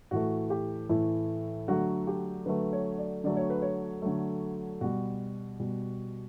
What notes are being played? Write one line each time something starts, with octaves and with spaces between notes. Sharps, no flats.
A2 E3 A3 F#4
G4
A2 E3 A3 E4
D3 F#3 A3 F#4
G4
D3 F#3 A3 B4
C#5
D5
D3 F#3 A3 D5
C#5
B4
C#5
D3 F#3 A3
B2 G3 F#4
B2 G3